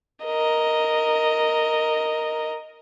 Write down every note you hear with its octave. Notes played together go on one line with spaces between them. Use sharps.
A#4 D#5